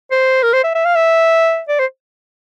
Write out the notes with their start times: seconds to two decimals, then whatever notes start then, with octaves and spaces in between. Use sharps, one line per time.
0.11 C5
0.43 A#4
0.53 C5
0.64 E5
0.75 E5
0.85 F5
0.95 E5
1.68 D5
1.79 C5